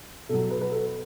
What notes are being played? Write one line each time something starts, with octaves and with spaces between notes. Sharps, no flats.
B2 F#3 A4
B4
B4
A4